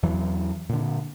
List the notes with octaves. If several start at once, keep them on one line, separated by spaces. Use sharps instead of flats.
E2 E3 F#3
A#2 D3